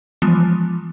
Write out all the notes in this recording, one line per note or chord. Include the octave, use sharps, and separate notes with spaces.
E3 F3 G3 G#3 B3 F4